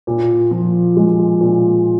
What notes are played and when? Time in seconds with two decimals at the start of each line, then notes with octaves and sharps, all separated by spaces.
0.07 A#2
0.51 F3
0.97 G#3
1.41 A#2